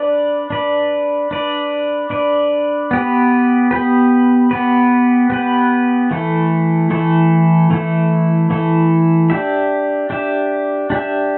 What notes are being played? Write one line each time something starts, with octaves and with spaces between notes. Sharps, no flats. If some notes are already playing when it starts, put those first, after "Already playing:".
Already playing: D4 B4 D5
D4 B4 D5
D4 B4 D5
D4 B4 D5
B3 G4 B4
B3 G4 B4
B3 G4 B4
B3 G4 B4
E3 A3 E4 A4
E3 A3 E4 A4
E3 A3 E4 A4
E3 A3 E4 A4
D4 G4 E5
D4 G4 E5
D4 G4 E5